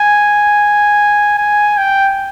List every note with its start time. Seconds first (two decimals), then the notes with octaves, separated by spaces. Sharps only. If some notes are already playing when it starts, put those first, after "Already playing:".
Already playing: G#5
1.38 G#5
1.78 G5